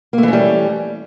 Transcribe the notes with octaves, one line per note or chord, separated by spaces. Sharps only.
E3 G3 A3 A#3 C#4